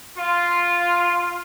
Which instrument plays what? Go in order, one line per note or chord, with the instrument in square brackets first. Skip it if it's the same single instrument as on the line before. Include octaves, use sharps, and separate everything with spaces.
[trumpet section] F4